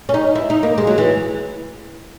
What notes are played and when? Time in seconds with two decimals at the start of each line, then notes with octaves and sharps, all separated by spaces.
0.09 C#4
0.14 D#4
0.35 E4
0.50 D#4
0.63 A#3
0.78 G#3
0.87 F#3
0.98 E3